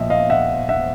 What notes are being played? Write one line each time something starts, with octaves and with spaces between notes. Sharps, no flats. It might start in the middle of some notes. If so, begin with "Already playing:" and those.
Already playing: A#2 F3 D#5 E5 G5
D#5 F5
E5 F#5
E5 F#5